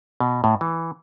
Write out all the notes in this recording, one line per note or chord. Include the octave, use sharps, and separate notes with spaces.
B2
A2
E3